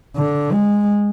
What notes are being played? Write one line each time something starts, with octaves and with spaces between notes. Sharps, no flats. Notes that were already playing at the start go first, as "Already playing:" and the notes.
D3
G#3